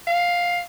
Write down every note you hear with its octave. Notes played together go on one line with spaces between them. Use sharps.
F5